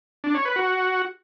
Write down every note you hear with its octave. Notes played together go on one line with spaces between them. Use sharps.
D4
C#5
B4
F#4